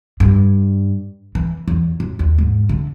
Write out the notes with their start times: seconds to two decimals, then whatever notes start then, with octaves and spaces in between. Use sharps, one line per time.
0.20 G2
1.35 E3
1.68 E2
2.00 F#2
2.19 D#2
2.38 G#2
2.69 D3